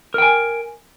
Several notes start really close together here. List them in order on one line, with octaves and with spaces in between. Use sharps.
A#4 G5 G#5